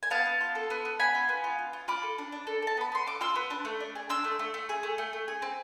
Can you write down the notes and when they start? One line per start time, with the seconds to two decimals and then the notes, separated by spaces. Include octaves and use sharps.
0.03 G#5
0.10 B3 F5 A5
0.25 B3
0.41 F4
0.55 A4
0.70 B3
0.85 B3
1.00 B3 G#5 B5
1.15 F4
1.29 B3
1.44 F4
1.59 F4
1.73 F4
1.88 F4 B5 D6
2.03 A4
2.18 D4
2.32 D4
2.47 A4
2.62 A4 A5
2.77 B3 B5
2.92 B3 C6
3.06 A4 D6
3.21 F4 C6 E6
3.35 B3
3.50 D4
3.65 A3
3.80 D4
3.95 G#4
4.09 D4 C6 E6
4.24 A3
4.39 A3
4.54 A3
4.69 G#4
4.83 A3
4.98 A3
5.13 A3
5.28 G#4
5.42 C4